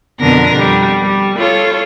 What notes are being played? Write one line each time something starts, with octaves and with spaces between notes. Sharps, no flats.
F2 B2 D3 B3 A#4 A#6
G3
G3
F4 A4 C#5